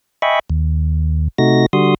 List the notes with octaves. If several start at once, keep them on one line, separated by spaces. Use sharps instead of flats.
D#5 E5 G5 G#5 B5 C#6
D#2
C3 A3 D#4 F#4 A#6
D3 G3 F#4 C6 D#6